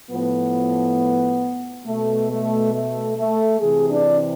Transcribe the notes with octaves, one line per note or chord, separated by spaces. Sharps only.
A2 F3 B3
B2 A3
A3
A3
A3
C3 E3 G#4
D4